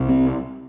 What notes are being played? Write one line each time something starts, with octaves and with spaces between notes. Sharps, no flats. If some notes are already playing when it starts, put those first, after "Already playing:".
Already playing: C2 C3
C4